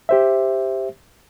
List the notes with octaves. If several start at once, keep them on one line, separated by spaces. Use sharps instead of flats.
G4 C5 E5